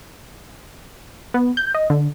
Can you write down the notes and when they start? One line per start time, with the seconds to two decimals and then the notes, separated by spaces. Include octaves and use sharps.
1.34 B3
1.57 G6
1.74 D#5
1.90 D3